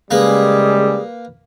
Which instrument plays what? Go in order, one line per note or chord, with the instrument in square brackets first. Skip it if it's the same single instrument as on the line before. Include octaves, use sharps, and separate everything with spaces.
[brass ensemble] C#3 G#3 [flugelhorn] G3 [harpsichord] A#3 B4 [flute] G#4